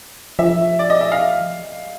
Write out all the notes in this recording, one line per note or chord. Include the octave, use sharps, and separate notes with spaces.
F3 E5
D5
D#5
E5
F5